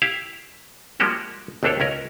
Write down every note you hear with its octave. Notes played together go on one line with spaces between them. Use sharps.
E4 G4 E5 F5
F3 G3 G#3 A#3 F#4 G4
G#1 D#2 A3 D4 A4 C#5
C#2 C#4 A#4